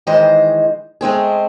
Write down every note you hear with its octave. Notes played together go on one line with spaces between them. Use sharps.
D#3 E3 G#3 C5 D#5
G#3 A3 C4 G#4